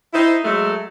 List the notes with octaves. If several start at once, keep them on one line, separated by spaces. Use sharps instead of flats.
D#4 E4 C5
F#3 G#3 A3